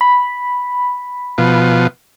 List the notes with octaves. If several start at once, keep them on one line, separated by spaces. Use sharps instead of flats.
B5
B2 F3